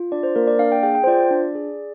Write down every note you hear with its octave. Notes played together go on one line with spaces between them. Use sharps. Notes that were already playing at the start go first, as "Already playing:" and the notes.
Already playing: F4
D4 D5
C5
A#3 A#4
D5
D4 F5
G5
G#4 G5
G5
C5
F4 D5
D4
G#4